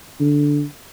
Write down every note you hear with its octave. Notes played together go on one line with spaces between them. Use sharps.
D3